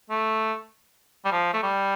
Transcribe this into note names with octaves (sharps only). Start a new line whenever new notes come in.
A3
G3
F3
A3
G3